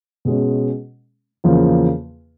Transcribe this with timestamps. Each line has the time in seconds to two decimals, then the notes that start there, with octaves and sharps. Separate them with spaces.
0.25 B2 G#3 C#4
1.44 E2 C#3 F3 A#3